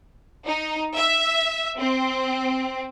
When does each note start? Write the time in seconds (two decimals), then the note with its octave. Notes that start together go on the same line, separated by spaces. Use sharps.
0.46 D#4
0.95 E5
1.78 C4